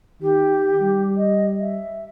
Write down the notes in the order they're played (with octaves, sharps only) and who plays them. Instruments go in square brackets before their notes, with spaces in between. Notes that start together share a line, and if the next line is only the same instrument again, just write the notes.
[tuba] D#3 [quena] G4
[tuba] G3
[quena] D#5
E5